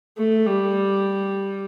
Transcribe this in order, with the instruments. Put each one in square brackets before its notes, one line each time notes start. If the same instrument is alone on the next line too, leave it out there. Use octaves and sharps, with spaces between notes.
[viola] A3
G3